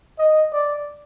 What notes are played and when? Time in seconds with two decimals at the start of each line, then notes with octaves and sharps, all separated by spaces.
0.19 D#5
0.52 D5